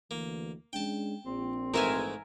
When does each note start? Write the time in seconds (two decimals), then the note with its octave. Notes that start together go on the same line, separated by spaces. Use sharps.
0.11 D2 E3 A#3
0.73 G#3 C#4 D4 G5 A5
1.25 A#1 C4
1.74 G#2 E3 A3 A#4 E5 G#5